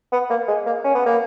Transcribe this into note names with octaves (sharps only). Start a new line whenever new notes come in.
B3
A#3
G#3
A#3
C#4
B3
A#3